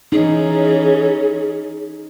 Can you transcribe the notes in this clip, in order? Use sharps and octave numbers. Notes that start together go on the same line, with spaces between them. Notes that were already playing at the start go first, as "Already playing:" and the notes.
E3 C#4 D#4 G#4